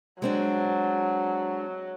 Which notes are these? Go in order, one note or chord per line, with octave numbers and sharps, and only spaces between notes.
F#3 G#3 C4 D4